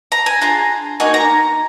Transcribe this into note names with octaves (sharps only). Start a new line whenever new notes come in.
A#5
G#5
D4 F4 G#4 A#5
A#3 D#4 F#4 G#5
A#5